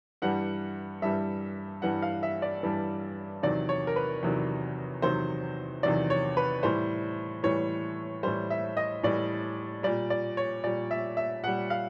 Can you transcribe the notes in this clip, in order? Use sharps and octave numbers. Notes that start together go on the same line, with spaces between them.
G2 E3 G3 F#5
G2 E3 G3 E5
G2 E3 G3 F#5
F5
E5
D5
G2 E3 G3
E2 C3 D#3 F#3 D5
C#5
A#4
B4
E2 C3 D#3 F#3
E2 C3 D#3 F#3 C5
E2 C3 D#3 F#3 D5
C#5
B4
A2 E3 G3 C5
A2 E3 G3 C#5
A2 E3 G3 C5
E5
D#5
A2 E3 G3 D5
A#2 G3 D5
D5
C#5
A#2 G3 D5
E5
E5
A#2 G3 F#5
F5